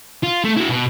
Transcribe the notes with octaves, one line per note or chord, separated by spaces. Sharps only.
F4
A3
E4 F#4
B2